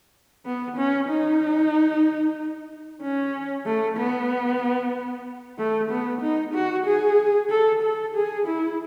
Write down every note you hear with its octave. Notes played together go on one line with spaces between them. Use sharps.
B3
C#4
D#4
C#4
A3
B3
A3
B3
D#4
F#4
G#4
A4
A4
G#4
E4